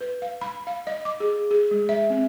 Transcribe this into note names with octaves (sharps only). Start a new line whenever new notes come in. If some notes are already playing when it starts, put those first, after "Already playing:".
B4
F5
B5
F5
D#5
D6
G#4
G#4
G#3
E5
C4